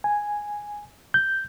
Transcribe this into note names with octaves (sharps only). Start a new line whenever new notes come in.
G#5
G6